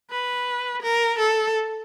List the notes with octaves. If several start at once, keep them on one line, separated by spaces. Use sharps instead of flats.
B4
A#4
A4